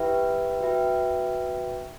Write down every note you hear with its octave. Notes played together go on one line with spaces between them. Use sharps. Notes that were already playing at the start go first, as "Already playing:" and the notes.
Already playing: E4 G4 B4 E5 G5
F#4 B4 E5 G5